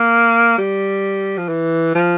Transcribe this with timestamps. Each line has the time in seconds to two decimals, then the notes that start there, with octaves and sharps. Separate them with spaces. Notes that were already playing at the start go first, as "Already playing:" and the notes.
Already playing: A#3
0.58 G3
1.38 F3
1.49 E3
1.95 F3